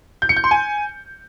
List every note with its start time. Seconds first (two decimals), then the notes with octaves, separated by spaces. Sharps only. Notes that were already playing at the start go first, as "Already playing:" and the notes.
0.22 G6
0.29 C#7
0.37 G6
0.44 C6
0.51 G#5